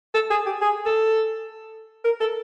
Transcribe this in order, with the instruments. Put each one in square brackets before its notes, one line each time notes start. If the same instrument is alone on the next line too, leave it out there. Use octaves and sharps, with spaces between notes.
[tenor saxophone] A4
G#4
G4
G#4
A4
A#4
A4